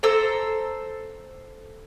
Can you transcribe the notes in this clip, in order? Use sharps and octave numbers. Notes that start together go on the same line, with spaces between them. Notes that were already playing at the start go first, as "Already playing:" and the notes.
A4 C5 A#5 E6